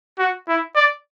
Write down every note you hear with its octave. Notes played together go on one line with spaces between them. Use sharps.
F#4
E4
D5